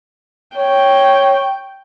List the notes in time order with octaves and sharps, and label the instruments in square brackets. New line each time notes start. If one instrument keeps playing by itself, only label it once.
[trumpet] C#5 [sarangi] G5